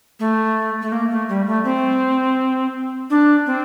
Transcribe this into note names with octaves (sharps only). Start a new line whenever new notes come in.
A3
A3
A#3
A3
G3
A3
C4
D4
C4